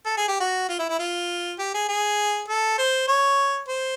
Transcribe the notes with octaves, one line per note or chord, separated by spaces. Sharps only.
A4
G#4
G4
F#4
F4
E4
E4
F4
G4
G#4
G#4
A4
C5
C#5
C5